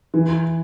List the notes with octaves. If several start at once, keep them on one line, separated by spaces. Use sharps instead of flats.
E3